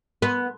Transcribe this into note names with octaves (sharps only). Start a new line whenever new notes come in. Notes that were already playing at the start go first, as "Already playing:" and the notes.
B3